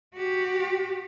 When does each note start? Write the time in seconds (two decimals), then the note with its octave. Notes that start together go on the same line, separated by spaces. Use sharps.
0.14 F#4 G4